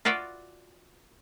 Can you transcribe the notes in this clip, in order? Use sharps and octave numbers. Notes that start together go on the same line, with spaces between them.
F4 F#4 B4 D5 E5